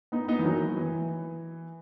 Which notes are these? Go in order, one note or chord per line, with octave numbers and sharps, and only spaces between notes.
B3 D#4
B3 D#4
E3
D#3 F#3
E3